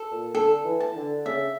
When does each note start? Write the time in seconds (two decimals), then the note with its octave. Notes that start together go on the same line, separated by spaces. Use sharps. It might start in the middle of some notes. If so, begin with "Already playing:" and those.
Already playing: A4
0.11 A#2
0.34 D3 A4
0.64 E3
0.80 A5
0.96 D3
1.26 C#3 E5